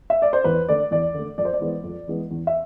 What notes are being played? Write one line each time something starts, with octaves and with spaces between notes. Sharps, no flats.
E5
D5
C5
E2 B4
D3 A3 D5
E2 D5
D3 A3
F2 D5
C5
D5
E3 G#3 B3
F2
E3 G#3 B3
E2
E5